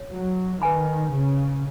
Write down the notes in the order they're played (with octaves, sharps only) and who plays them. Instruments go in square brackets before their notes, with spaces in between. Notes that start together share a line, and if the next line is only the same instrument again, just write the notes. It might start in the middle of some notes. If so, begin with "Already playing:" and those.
Already playing: [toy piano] C#5
[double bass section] F#3
[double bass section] D#3 [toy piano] B4 G#5 B5
[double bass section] C#3